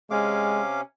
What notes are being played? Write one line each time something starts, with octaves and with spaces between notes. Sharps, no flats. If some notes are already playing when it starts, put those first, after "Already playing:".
C3 G#3 C#4 F5 D6